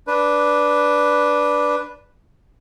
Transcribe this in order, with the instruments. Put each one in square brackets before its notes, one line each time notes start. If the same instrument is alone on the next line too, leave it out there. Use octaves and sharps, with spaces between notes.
[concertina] D4 B4